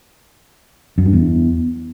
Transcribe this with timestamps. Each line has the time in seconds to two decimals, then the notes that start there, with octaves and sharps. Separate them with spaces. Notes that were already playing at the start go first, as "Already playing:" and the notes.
0.98 F#2
1.05 G2
1.13 E2